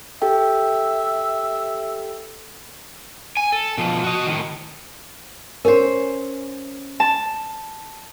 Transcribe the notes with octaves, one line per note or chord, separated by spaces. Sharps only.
G4 A4 E5 G5
G#5
A4
B2 F3
F#4 D#5
A2 D#3
C#4 A#4 C5
A5